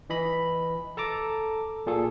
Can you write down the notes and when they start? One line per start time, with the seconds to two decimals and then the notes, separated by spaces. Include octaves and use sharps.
0.10 E3 D#5 B5
0.97 A4 A5 A#5 D6
1.86 A#2 F4 G#4 A4